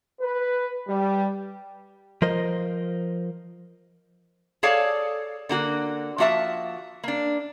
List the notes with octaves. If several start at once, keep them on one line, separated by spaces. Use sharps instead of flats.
B4
G3
F3 F4 A#4 C5 D#5
G#4 A4 C#5 D5 F5 A5
D3 A#3 F#4
F3 A#3 F#4 E5 A5
A#3 D4